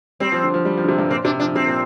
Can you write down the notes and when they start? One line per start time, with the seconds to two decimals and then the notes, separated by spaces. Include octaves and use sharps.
0.20 G3 C4
0.32 F3
0.44 D3
0.54 F3
0.65 G3
0.77 F3
0.84 D3
0.89 C3
0.99 G2
1.10 A#2 C4
1.25 C3 D4
1.39 F3 D4
1.55 C3 C4
1.67 A#2